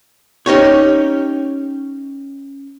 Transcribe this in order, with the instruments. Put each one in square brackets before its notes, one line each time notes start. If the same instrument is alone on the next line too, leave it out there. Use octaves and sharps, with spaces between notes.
[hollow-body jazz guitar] C#4 D#4 G4 C#5